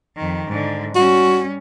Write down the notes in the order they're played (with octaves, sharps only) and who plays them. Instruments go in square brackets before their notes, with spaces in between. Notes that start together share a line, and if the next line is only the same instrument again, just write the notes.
[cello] F2 D#3
G#2 D3
[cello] G3 C#4 [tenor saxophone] F#4